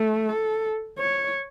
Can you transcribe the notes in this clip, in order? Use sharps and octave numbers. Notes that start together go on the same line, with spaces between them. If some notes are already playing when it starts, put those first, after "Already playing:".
Already playing: A3
A4
C#5